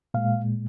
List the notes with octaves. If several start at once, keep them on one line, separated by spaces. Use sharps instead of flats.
A#2 G#3 F5